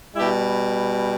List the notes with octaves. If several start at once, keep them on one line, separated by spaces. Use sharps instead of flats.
B2 G3 E4 G4